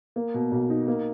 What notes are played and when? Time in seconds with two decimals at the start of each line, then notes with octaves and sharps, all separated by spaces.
0.16 A#3
0.34 B2
0.51 B1
0.70 D#4
0.88 A#3